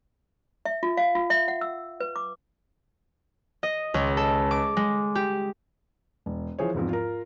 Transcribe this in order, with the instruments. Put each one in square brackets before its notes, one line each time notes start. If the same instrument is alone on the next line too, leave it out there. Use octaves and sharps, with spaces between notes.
[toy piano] E5
F4
F5
F4
E5
F#5
E6
B4
D6
[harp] D#5
C#2
A4
D6
G#3
G4
[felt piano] E1
E3 F3 G#4 C5 C#5
E2 G#2 F3 C4
F4 A#4